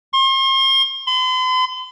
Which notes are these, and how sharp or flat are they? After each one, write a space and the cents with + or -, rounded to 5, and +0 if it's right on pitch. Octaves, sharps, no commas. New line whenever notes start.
C6 +40
C6 -45